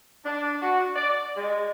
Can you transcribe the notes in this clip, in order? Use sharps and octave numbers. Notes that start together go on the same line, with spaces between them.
D4
F#4
D5
G#3